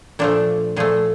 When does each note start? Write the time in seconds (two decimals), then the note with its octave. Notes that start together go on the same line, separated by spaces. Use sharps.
0.19 A#2 F3 A3 D4
0.76 A#2 F3 A3 G#4